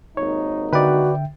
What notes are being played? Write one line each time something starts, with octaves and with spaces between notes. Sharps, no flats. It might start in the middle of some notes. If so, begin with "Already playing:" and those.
G#1 D#2 D#4 C#5
D3 F#4 B4 D5 E5 G5